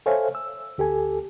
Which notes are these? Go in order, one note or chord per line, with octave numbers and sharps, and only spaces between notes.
A4 C5 C#5 E5 F5 G#5
E6
D2 G4 A4 G#5